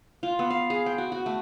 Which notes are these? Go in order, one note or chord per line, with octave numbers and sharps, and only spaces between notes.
F4
B3
F5
G#4
G5
F#4
F#4
A3